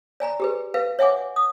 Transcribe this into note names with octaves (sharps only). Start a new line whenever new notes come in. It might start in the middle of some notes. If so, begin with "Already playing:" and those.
D5 G#5 A#5 B5
G4 G#4 B4
B4 F5
C#5 E5 F#5 G#5 D6
D#6